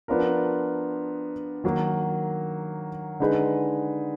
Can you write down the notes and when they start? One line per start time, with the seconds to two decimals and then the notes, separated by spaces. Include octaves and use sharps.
0.08 F3 B3 D4 F4 A#4
1.64 D#3 F#3 A#3
3.20 D3 G#3 D#4 G#4 B4